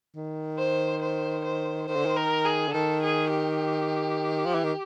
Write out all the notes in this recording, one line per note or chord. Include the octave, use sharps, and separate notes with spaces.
D#3
C5
C5
C5
D#3 C5
D3
D#3
A#4
G#4
D3
D#3 A4
G#4
G4
F3
E3
D#3